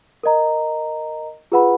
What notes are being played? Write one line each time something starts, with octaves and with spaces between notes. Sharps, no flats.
A#4 D#5 A#5
F4 G#4 B4 F#5 B5